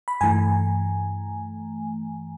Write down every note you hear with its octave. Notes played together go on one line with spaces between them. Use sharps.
B5
G2 E3 A3 G#5 A#5